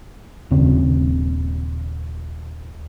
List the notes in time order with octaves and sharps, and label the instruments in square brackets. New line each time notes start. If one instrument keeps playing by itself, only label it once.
[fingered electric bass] D#1 C#3 C4